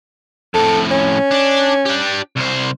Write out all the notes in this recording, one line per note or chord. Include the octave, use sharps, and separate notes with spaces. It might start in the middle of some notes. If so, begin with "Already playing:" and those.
F2 A2 A4
C#4
D4
D4 G4
C2 C5